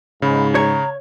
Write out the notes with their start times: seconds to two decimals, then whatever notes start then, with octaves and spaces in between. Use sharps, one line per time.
0.22 G#2 C#3 B5
0.55 C#5 A#5